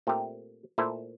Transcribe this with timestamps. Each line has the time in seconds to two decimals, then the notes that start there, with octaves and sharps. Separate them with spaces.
0.07 A#2 A3 C4 G4 A#4
0.78 A#2 A3 E4 A4 C5